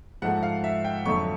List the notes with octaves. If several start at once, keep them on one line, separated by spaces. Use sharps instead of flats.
G#2 F3 A3 F#5
F5
E5
G5
F2 D3 F#3 A3 C#6